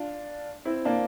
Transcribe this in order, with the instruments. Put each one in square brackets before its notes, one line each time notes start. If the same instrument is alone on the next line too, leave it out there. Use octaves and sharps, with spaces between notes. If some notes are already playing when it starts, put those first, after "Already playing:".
Already playing: [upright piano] D4 F4
C4 E4
A#3 D4